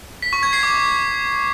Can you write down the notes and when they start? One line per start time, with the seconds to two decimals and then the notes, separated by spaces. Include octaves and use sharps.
0.22 B6
0.33 C#6
0.43 G#6
0.53 C7
0.63 D6